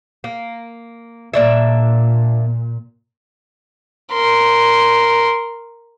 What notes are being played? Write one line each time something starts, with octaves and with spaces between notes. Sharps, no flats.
A#3
A#2 A#3 D4 E5
A#4 C6